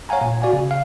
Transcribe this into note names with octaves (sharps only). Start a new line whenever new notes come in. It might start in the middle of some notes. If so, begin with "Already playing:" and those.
C#5 F5 F#5 G#5 A#5
A#2
F#4 D5 F5 G#5
C#3
F5